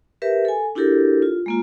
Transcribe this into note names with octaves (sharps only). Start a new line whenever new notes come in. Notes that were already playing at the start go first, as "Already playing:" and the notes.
G4 A#4 B4 E5
A4 G#5
D4 E4 F#4 G4 A4 A#4
F4
G#3 A#3 F4